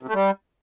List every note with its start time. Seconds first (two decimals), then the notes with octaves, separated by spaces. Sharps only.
0.03 C3
0.09 A3
0.14 G3